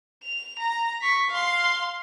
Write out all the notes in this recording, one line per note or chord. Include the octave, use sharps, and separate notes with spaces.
F7
A#5
C#6 B6
F5 C6